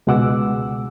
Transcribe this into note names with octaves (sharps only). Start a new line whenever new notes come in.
C#2 B2 G#3 F#5 D6 E6